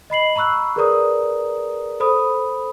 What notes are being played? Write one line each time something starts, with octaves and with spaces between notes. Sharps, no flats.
D#5 B5 C7 F#7
A#5 B5 C#6 E6 F#6
G#4 A#4 B4 D5 A#5 D#6
A4 C5 B5 D#6